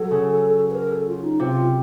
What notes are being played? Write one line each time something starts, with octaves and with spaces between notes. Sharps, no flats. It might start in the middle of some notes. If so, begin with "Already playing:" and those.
Already playing: F#3 A4
C#3
B4
A#4
A4
F4
D#4
C3 F4